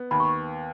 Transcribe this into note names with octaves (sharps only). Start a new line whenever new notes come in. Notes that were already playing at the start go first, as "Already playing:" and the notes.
Already playing: B3
D#2 B5
C#6